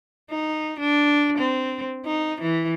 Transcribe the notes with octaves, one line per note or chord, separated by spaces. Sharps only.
D#4
D4
C4
D#4
E3